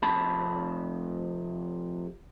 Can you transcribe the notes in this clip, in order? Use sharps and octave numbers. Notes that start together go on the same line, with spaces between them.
F2 C3 A5 B5